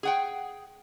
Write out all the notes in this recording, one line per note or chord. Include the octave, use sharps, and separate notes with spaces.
G#4 F#5 G5